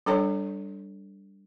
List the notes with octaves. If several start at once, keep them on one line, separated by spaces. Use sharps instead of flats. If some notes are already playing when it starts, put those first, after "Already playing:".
G3 D4 A4 C#5 G5